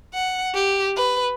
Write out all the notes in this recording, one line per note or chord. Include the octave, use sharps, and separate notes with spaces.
F#5
G4
B4